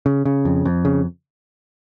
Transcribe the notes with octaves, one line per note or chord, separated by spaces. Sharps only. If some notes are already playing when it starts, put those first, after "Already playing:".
C#3
C#3
F2
F2
C#3